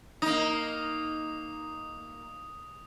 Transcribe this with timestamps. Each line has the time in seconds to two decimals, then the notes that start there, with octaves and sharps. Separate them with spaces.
0.22 A#3 D#4 D#6